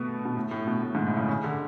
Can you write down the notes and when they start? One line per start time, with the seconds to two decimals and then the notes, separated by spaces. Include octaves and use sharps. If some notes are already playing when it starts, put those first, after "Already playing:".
Already playing: B2 A3 B3
0.25 B2
0.37 A2
0.51 A2
0.67 B2
0.83 A2
0.95 G#2
1.06 A2
1.17 C#3
1.29 C#3
1.44 D3